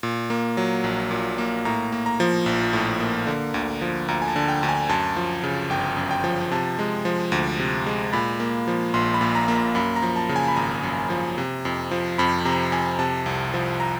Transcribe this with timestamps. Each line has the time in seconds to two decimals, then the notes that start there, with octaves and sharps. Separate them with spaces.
0.03 A#2
0.30 A#3
0.57 F#3
0.84 A#1
1.11 A#2
1.38 A#3
1.65 A2 A#5
1.92 A#3
2.06 A#5
2.20 F3
2.46 A#1
2.73 A2
3.00 A#3
3.27 D3
3.54 D2
3.81 F3
4.08 D2 A#5
4.22 G#5
4.28 A5
4.36 D3
4.48 G5
4.63 D2
4.69 G#5
4.89 F#2 A5
5.16 F3
5.43 C#3
5.70 G1 G5
5.97 F#2
6.11 G5
6.24 F3
6.51 C3 A5
6.79 G#3
7.05 F3
7.32 D2
7.59 C3
7.86 G#3
8.13 A#2 B5
8.40 A#3
8.68 F3
8.94 A#1 C6
9.14 B5
9.21 A#2
9.35 A#5
9.48 A#3
9.55 A#5
9.75 F#2 B5
9.96 A#5
10.02 F3
10.16 A5
10.29 C#3
10.36 G#5
10.48 B5
10.56 G#1 A#5
10.83 F#2
11.10 F3
11.38 C3
11.65 F2
11.91 F3
12.18 F2 B5
12.45 C3 A#5
12.72 F2 G#5
12.99 C3 A5
13.26 C2
13.54 F3
13.80 A#5